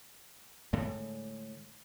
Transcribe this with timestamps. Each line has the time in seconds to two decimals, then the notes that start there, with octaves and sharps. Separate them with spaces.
0.73 A2 D3 G#3